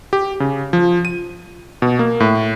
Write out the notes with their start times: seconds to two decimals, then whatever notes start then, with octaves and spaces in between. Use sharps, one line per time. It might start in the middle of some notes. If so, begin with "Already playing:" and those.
0.13 G4
0.40 C#3
0.73 F3
1.05 D#7
1.82 B2
1.99 A#3
2.20 A2